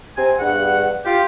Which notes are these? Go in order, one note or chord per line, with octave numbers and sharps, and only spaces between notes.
C3 C4 G#5
E2 G2 F#5
F4 G4